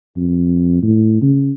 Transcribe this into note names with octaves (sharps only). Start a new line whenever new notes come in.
F2
A2
C#3